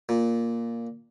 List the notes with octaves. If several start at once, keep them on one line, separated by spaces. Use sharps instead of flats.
A#2